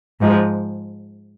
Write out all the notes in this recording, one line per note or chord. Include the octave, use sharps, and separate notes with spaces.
G#2 F3 G#3